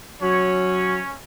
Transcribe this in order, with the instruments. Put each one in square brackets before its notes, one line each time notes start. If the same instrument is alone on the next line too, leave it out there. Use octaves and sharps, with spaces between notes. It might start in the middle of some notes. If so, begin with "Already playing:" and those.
[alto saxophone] F#3 [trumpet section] C#4 C#5